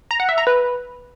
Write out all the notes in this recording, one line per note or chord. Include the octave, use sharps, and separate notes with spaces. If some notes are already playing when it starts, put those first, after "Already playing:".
A#5
F#5
E5
A#5
B4